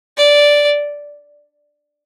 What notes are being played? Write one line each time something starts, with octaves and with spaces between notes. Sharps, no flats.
D5